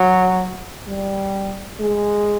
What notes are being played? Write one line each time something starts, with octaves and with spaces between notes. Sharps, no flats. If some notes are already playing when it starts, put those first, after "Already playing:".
Already playing: F#3
G3
G#3